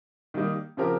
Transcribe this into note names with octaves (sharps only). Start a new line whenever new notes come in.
D#3 G3 A#3 D#4
C#3 F3 C4 G4 A#4